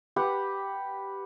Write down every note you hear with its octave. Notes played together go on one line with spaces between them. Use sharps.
G4 B4 F#5